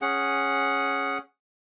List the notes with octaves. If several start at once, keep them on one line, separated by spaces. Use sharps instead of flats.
C#4 G#4 F#5